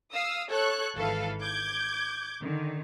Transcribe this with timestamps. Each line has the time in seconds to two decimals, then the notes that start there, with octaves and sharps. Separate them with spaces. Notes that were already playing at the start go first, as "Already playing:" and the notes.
0.12 F5 D#6 E6
0.49 A4 C#5 C#6 F#6
0.96 G#1 E3 A4 B4 F5
1.43 D6 G6 G#6
2.42 D3 D#3